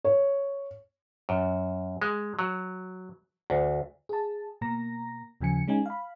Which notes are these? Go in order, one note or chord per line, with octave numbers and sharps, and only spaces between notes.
C#5
F#2
G#3
F#3
D2
G#4 A5
B2 A#3 A#5 A#6
D#2 C#3 F3 G#5 C#7
G#3 C#4 D#4 G#5
F5 B5